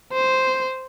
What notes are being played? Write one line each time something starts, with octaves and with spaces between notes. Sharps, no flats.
C5